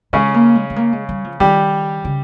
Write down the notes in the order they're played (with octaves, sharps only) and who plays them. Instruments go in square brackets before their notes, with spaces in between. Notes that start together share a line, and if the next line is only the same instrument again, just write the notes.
[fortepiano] C#3 C#4 [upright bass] G#3
[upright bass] A#3
G#3
G#3
A#3
G#3
G3
F3
[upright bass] D#3 [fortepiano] G3 G4
[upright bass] C#3